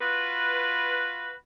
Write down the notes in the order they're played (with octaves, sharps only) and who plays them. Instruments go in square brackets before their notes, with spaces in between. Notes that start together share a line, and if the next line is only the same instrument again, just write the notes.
[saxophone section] F4 F#4 B4